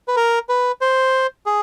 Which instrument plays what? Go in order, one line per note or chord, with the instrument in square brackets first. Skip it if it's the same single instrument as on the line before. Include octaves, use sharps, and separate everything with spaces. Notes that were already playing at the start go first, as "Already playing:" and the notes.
[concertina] B4
A#4
B4
C5
G#4